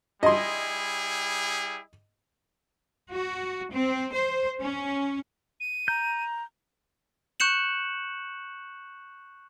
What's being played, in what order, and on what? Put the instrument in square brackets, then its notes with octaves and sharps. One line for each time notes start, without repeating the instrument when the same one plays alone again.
[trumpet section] G3 E4 G#4 [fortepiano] D#5 C6
[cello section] F#4
C4
C5
C#4
[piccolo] D#7
[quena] A#5 [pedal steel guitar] G6
[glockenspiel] C#6 F#6 G6 C#7 E7 F#7